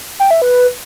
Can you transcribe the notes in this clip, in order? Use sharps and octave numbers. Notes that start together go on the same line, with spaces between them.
G5
E5
B4